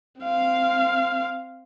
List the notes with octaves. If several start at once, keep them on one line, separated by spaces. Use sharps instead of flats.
C4 F5